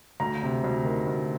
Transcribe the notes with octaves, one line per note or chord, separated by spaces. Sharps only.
D2 A#5
C3
D2
D#3
D2